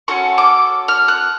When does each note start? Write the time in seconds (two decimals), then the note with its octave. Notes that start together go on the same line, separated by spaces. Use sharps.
0.08 C#4 F#4 A4 C#6
0.38 D6
0.88 F6
1.08 F#6